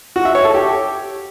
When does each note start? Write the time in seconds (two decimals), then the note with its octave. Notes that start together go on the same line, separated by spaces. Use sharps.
0.16 F#4
0.25 E5
0.35 C#5
0.44 A4
0.54 G4